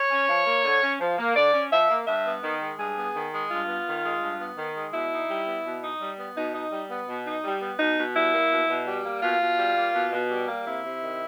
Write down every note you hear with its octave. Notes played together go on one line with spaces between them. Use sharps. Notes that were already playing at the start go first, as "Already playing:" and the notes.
Already playing: C#5
C#4
F3
A#3
D3
C#4
F3
A#3
D3 D5
C#4
F3 E5
A#3
G2 E5
B3
D#3
G#3
G2 G#4
B3
D#3
G#3
G2 F4
B3
D#3
G#3
G2
B3
D#3
G#3
B2 E4
D#4
G3
B3
B2
D#4
G3
B3
B2 D#4
D#4
G3
B3
B2
D#4
G3
B3
B2 D#4
B2
G3 E4
A#3
B2
B2
G3
A#3
B2 F4
B2
G3
A#3
B2
B2
G3
A#3
C3 E4
C3
D#3